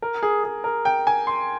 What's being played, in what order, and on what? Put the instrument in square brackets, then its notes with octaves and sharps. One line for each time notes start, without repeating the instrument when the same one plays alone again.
[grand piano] A#4
G#4
G#4
A#4
G5
G#5
C6